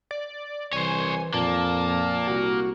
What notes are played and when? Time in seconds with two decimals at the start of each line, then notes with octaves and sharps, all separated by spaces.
0.11 D5
0.73 C2 E3 C5 C#5 G#5
1.34 F2 A#2 A#3 A5
2.27 C2 F#4